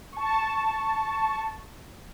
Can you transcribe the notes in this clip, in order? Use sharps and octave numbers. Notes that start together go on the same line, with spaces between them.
A5 C#6